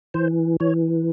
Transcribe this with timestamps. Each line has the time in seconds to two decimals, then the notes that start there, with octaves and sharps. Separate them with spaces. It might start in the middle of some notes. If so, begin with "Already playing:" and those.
0.14 E3 C5
0.60 E3 C#5